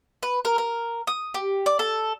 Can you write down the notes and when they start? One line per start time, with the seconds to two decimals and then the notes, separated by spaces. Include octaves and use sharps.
0.23 B4
0.45 A#4
0.58 A#4
1.07 D#6
1.34 G4
1.66 D5
1.79 A4